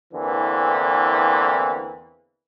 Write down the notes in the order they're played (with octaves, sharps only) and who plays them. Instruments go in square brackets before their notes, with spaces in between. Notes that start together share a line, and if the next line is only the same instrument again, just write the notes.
[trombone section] E2 D3 E3 A#3 C4